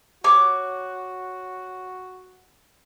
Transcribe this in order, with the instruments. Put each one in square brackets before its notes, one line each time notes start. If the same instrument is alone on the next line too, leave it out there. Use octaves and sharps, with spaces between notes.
[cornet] F#4 [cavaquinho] C#5 D6